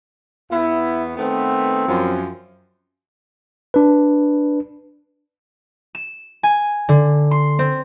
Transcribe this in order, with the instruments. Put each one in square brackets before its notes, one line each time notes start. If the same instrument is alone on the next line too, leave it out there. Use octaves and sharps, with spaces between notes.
[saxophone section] E2 B3 [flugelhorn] E4
[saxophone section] D#3 A3 B3 [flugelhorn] C4
[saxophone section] F#2 F3
[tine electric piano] D4 B4
[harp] E7
G#5
D3
C6
C4